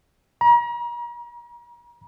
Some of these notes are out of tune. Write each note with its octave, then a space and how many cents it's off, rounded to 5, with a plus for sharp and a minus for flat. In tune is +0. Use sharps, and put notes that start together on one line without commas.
A#5 +40